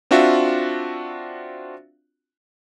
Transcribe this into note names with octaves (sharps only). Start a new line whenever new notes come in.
C4 D4 F4 F#4 E5